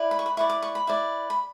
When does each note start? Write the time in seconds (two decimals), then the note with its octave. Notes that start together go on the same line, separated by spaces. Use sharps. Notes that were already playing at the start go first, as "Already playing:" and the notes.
Already playing: E4 B4 D5
0.11 B5
0.19 C#6
0.26 B5
0.37 E4 B4 D5 C#6
0.50 D6
0.62 C#6
0.75 B5
0.87 E4 B4 D5
1.30 B5